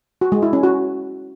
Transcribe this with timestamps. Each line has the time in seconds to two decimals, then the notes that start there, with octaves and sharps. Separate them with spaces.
0.21 F#4
0.32 G#3
0.42 E4
0.53 C#4
0.63 F#4